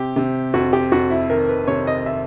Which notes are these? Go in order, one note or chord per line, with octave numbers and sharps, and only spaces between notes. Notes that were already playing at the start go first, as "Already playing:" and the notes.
Already playing: C3 G4
C3
F2 F#4
G4
F2 F#4
E4
D#3 A#4
B4
C3 C#5
D#5
E5